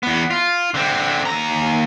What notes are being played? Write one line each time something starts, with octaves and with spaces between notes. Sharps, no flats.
E2 B3
F4
D3 C4
D#2 A#5